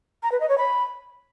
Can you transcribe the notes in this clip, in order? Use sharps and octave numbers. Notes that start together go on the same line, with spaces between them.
A#5
B4
D#5
C#5
B5